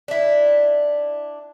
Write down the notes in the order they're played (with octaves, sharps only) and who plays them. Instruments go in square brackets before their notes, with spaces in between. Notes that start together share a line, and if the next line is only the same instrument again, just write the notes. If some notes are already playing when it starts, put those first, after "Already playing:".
[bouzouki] D4 E4